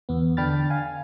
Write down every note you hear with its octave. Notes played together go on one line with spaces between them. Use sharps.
E2 B3
D3 D4 G5 B5 F6 A6
F5 G#5